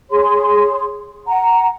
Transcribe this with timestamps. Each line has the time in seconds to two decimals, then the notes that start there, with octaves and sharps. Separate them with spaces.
0.11 G#4 C#5 C6
1.27 F#5 A#5